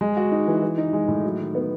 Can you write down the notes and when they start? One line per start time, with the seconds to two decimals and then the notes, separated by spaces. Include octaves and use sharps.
0.01 G#3
0.17 F#4
0.32 D#4
0.47 E3
0.62 E3
0.78 D#4
0.93 G#3
1.08 A2
1.24 F#3
1.39 D#3
1.55 B3